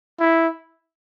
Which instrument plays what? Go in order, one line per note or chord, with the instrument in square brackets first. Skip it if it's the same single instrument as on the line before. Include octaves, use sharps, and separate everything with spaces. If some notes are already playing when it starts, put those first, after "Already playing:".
[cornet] E4